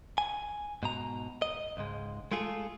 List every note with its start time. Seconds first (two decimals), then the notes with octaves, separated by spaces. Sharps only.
0.18 G#5
0.83 G#2 B2 A#5
1.42 D#5
1.77 C#2 G#2 G#3
2.32 G#3 A3 F4 G#4 A4